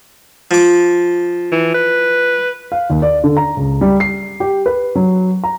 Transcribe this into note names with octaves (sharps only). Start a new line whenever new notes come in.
F3 D6
E3
B4
F5
D#2
D5
D3
A#5
C#2
G3
C7
G4
B4
F#3
A#5